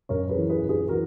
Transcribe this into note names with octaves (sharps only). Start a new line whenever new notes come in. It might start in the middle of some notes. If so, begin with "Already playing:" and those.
F#2 A#4 C#5
G#4 B4
E3
G#4 B4
F#2
G#4 B4
E3 F#4 A#4